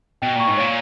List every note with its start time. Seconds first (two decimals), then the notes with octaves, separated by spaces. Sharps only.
0.22 B2 G5
0.36 A#2 C#6
0.48 G#2
0.57 A#2 C#5